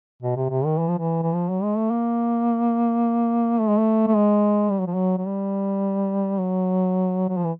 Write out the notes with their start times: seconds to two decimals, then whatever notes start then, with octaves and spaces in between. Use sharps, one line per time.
0.22 B2
0.36 C3
0.50 C3
0.65 D#3
0.78 E3
0.88 F3
0.98 E3
1.23 E3
1.34 F3
1.49 F#3
1.63 G#3
1.77 A3
1.90 A#3
3.59 A3
3.69 G#3
3.77 A3
4.07 A3
4.15 G#3
4.71 G3
4.79 F#3
4.87 F3
4.94 F#3
5.18 F#3
5.27 G3
6.39 F#3
7.29 F#3
7.37 F3
7.44 E3